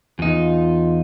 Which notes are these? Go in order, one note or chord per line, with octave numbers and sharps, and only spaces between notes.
E2 D#4 F4